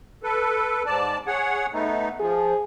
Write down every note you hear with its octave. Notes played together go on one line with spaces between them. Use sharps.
A4 B4
G#2 D5 A5
G#4 C#5 F#5
A3 B3 D#4
F3 G#4